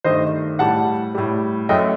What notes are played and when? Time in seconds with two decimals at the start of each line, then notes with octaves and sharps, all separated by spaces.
0.04 G2 D#3 A3 C5 D#5
0.59 A2 G3 F#5 A5
1.15 A2 G3
1.69 F#2 F#3 A3 D#5 G5